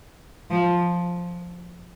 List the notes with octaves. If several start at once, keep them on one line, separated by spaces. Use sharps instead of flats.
F3